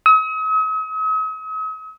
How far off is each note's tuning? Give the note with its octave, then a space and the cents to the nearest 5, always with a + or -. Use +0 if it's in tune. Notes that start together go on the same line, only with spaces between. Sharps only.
D#6 +45